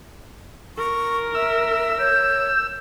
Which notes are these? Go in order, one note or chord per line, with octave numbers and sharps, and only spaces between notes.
A#4 C#6
E5 E6
C#5 G6